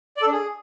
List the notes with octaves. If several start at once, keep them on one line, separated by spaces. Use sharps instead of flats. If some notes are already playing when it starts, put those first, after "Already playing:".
D5
A4
D4
G#4